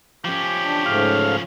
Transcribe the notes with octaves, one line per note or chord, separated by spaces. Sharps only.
F3 C#4 G4
D4
G#2 C#3 A3 F5